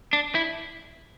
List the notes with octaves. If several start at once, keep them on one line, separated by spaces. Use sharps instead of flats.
D4
E4